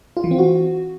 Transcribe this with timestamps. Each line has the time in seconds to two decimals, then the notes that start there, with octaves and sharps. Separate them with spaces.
0.17 F4
0.24 E3
0.31 C4
0.38 F#4